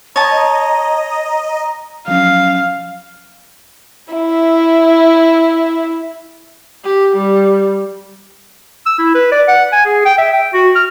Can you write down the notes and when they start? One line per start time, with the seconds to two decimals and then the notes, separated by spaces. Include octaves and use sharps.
0.16 C#5 D#5 A5 A#5
2.08 F3 F#3 C#4 F5
4.12 E4 E5
6.84 G4
7.15 G3
8.86 E6
8.99 E4
9.15 B4
9.32 D5
9.48 F#5
9.73 G#5
9.86 G#4
10.05 G5
10.18 E5
10.33 G5
10.53 F#4
10.75 F6